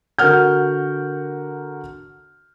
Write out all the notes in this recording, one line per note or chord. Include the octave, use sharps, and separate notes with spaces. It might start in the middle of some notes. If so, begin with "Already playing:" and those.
D3 F#4 A#4 F#5 F6 G6